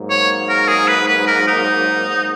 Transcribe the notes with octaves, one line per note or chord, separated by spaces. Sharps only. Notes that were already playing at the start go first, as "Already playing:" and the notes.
Already playing: G#2 F#3 A#3
C#5
A#4
G#4
B4
B4
A#4
D#4